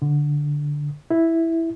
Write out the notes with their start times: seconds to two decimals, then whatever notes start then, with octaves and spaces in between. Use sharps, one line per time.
0.02 D3
1.11 E4